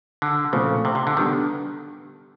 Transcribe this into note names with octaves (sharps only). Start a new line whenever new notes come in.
D3
A#2 C#3 F3 A3 C4
C3
C3
D3
D3 D#3 G3 B3